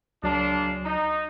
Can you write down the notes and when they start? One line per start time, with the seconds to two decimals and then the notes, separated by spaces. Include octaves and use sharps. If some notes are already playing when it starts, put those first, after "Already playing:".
0.23 C#2 F#3 G#3 A#3 D4
0.84 D#4